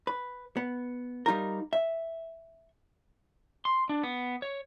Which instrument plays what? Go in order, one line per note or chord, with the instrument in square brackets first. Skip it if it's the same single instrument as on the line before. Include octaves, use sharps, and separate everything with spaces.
[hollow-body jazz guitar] B4
B3
G3 D#4 F4 A#4
E5
[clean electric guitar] C6
D4
B3
C#5